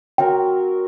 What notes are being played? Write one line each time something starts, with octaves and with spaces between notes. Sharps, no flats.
F#3 C4 F#4 A#4 G5